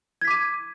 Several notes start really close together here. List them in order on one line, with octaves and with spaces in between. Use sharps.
G#6 B6 D6 D#7